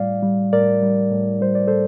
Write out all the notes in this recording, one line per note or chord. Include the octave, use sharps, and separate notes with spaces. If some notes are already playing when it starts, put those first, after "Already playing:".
Already playing: A2 G3 D5 F5
G3
A2 A#4 D5
G3
A2
G3 C5
D5
A2 A4 C5